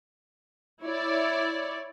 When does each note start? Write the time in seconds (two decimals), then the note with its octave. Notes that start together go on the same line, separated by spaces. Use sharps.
0.82 E4 C#5 D5